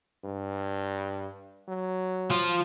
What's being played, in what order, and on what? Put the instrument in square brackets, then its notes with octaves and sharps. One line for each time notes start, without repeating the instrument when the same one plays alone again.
[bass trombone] G2
F#3
[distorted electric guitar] F3 F4